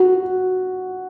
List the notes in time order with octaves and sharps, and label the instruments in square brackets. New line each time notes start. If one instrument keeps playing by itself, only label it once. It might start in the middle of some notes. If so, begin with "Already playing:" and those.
Already playing: [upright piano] F#4